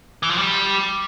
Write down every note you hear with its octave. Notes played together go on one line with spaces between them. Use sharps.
E3
F3
G3